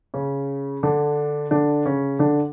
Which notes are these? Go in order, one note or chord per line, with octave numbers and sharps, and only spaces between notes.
C#3 C#4
D3 D4
D3 D4
C#3 C#4
D3 D4